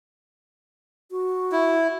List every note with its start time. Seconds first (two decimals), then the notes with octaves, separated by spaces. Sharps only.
1.11 F#4
1.52 E4